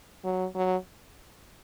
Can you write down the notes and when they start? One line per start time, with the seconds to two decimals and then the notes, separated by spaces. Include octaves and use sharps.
0.24 F#3
0.55 F#3